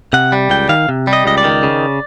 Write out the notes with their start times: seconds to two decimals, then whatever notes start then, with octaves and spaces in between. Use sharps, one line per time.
0.13 C3 F#5
0.32 G3
0.50 C#2 G5
0.69 D#3 F5
0.89 C3
1.07 G3
1.13 D#5
1.26 C#2 D#5
1.38 D5
1.44 D#3
1.63 C#3